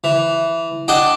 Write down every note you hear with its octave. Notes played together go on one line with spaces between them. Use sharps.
E3
D4 F#4 D#5 G5